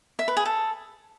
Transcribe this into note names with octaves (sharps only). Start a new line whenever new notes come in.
E5
B4
G#4
A4